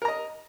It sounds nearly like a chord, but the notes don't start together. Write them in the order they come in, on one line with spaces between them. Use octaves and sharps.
A#4 A#5 D#5